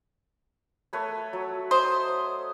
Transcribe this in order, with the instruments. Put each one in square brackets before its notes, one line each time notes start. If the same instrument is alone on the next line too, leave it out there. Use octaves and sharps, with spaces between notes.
[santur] A3 B4 C#5
F#3
[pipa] C5 [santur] D#5